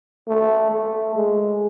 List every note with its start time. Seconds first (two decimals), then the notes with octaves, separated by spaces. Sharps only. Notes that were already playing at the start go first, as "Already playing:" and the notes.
0.28 A3
0.72 A3
1.16 G#3